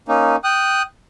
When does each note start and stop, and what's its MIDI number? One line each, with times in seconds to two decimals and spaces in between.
0.08 0.36 58
0.08 0.36 61
0.08 0.36 63
0.44 0.82 79
0.44 0.82 87
0.44 0.82 90